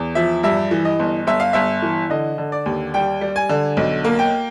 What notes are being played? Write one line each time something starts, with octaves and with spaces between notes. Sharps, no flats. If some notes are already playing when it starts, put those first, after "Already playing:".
Already playing: E2
F3 E5
G2 E5
E3
D#5
G1
G1 E5
F5
G1 E5
E3
D3 D#5
D3
D5
D#2
G3 G5
G3
G#5
D3
B1
A#3
G5